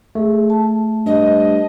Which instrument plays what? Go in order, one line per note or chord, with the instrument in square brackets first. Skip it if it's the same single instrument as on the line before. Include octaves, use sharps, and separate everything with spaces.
[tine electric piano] A3 [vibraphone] G#4
[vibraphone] A5
[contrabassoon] G2 [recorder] D#5